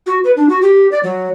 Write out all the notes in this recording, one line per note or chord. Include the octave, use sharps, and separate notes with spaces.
F#4
B4
D4
F#4
G4
D5
F#3